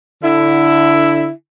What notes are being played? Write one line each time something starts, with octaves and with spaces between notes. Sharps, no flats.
D3 E4